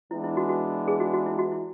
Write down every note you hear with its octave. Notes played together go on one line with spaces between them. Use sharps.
E3 G#3 B3 D4 E4
E4
F#4
F#4
G#4
F#4
F#4
E4
F#4
E4